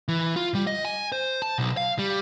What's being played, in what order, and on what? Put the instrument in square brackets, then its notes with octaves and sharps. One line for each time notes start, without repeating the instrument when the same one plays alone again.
[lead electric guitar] E3
F4
G3
D#5
G#5
C5
A5
B1
F5
G3